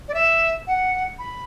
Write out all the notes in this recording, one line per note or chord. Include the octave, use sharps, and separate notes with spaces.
D5
E5
F#5
B5